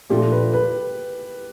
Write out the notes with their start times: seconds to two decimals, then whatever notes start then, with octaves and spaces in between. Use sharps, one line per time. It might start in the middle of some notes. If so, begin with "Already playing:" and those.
0.09 A#2 F3 A3 D4 F4 G4
0.32 B4
0.54 B4